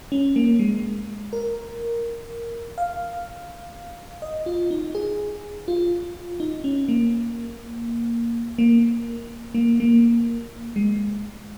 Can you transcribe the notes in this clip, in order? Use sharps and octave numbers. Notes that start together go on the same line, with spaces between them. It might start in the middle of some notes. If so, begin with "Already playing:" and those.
C#4
A#3
G#3
A#4
F5
D#5
F4
D#4
G#4
F4
D#4
C#4
A#3
A#3
A#3
A#3
G#3